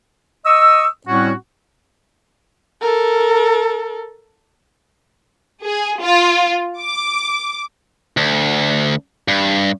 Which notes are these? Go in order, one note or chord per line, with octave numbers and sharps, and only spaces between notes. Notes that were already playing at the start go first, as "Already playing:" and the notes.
D#5 C#6 D#6 E6
A2 G3 C4 C#4 F#4
A4 A#4
G#4
F4
D6
D2
G2